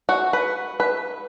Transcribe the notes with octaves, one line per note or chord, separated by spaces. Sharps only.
F#4
B4
B4